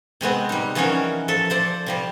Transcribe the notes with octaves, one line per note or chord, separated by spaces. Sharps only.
C3 G#3 B3 C4
G3 D#4
E3 F3 C#4 D#4 F#4 A#4
F3 A4 E5
F3 C5 D5
C3 F3 G3